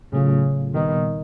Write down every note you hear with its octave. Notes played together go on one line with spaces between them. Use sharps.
A2 C#3 F#3 A3 C#4 F4
A#2 D#3 G3 B3 D#4